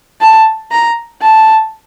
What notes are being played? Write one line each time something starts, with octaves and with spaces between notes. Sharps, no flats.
A5
A#5
A5